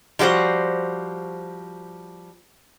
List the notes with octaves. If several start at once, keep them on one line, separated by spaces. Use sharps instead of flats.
F3 G3 F#4 A4 C5